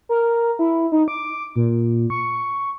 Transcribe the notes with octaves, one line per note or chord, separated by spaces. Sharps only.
A#4
E4
D#4
D6
A#2
C#6